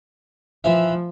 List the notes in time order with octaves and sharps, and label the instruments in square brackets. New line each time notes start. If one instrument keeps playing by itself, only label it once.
[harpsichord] E3 E5 [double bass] F3